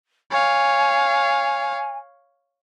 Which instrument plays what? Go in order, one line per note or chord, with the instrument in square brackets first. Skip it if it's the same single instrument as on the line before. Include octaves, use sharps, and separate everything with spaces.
[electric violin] C#5 F5 [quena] G#5